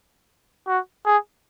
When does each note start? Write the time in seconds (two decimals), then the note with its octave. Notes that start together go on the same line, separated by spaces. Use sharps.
0.68 F#4
1.06 G#4